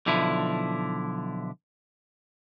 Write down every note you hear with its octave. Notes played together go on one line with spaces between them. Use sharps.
B1 D3 F3 E4